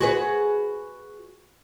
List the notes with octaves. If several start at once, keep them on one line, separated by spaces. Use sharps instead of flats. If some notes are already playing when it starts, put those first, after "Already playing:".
F#4 G#4 B4